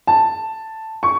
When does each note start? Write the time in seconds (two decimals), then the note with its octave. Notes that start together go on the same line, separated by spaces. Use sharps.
0.07 A5
1.03 C#6